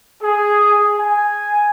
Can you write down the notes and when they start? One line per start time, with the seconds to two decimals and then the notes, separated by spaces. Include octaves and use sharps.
0.23 G#4
0.99 G#5